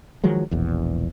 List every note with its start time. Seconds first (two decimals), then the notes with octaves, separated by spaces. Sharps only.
0.24 D#3 F3 F#3 G#3
0.51 E1 A#1 E2